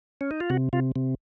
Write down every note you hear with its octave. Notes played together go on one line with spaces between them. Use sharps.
C#4
D#4
F4
C3 F#4
C3 F4
C3